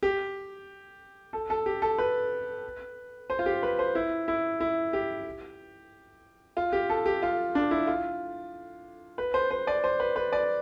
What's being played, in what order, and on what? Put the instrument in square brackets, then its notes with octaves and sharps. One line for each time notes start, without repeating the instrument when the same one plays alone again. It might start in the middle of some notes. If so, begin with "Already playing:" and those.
[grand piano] G4
A4
A4
G4
A4
B4
C5
F4
G4
B4
C5
E4
E4
E4
G4
F4
G4
A4
G4
F4
D4
E4
F4
B4
C5
C5
D5
C5
B4
B4
D5